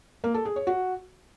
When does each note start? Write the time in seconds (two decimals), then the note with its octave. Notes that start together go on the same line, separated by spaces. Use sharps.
0.24 A#3
0.34 A4
0.45 G#4
0.56 C#5
0.67 F#4